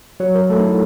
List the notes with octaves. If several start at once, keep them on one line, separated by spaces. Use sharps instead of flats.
F#3 C#5
A#4
A3 A4
D#4
E4